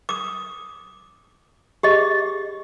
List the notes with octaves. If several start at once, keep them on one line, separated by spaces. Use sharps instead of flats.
D6 D#6
G4 G#4 D#5